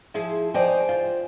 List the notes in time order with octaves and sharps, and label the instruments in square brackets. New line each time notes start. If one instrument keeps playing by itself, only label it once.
[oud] F3 E4 G#4
[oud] F3 D#4 D5 [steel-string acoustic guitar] C5 G5 G#5
[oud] F4